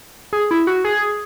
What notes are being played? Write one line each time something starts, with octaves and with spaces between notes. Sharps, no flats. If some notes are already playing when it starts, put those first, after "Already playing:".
G#4
E4
F#4
G#4